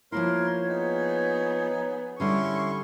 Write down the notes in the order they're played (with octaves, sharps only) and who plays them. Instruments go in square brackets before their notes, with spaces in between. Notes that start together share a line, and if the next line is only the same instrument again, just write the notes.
[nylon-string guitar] F3 A#3 E4 [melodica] A#4 C6 [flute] C#5
[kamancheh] B3 G#4 [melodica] D#4
[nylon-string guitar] D3 G3 D4 [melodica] C#4 E4 C6 [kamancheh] C#6